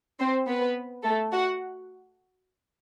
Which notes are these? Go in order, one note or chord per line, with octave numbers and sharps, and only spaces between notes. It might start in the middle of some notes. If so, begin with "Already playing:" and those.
C4 C5
B3 B4
A3 A4
F#4 F#5